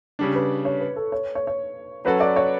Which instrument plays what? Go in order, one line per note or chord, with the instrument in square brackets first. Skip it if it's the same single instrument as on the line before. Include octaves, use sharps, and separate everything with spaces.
[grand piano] C#3 G3 D4
[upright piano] B4
C#5
B4
A4
C#5
C#5
C#5
[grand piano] F#3 C#4 F#4 A4 [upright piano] B4
[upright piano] D5
C#5